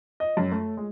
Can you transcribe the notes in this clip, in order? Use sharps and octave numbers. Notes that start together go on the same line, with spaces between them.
D#5
F#2
A3
G#3